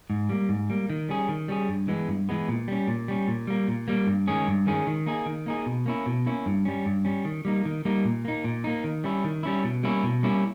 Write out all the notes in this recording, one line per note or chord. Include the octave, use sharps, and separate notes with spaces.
G#2
G3 A#3
G#2
G3 A#3
D#3
G3 C#4 G#4
D#3
G3 C#4 G#4
G2
E3 G#3 B3
G2
E3 G#3 B3
A#2
G3 C#4
A#2
G3 C#4
A#2
G3 A#3
A#2
G3 A#3
G2
D#3 G#3 C#4 G#4
G2
D#3 G#3 C#4 G#4
D#3
A#3 D#4 G#4
D#3
A#3 D#4 G#4
B2
A#3 C#4 E4
B2
A#3 C#4 E4
G2
G3 C#4
G2
G3 C#4
D#3
G3 A#3 D#4
D#3
G3 A#3 D#4
A#2
A#3 D#4
A#2
A#3 D#4
D#3
G3 C#4 E4
D#3
G3 C#4 E4
B2
G3 A#3 C#4 E4
B2
G3 A#3 C#4 E4